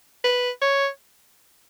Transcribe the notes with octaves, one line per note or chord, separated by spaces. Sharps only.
B4
C#5